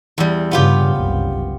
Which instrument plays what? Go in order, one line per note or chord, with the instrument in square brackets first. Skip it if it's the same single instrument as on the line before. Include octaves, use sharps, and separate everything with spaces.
[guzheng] E2 G3
[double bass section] G2 C#3 [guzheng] B3 F4 G4
[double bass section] F#1 C2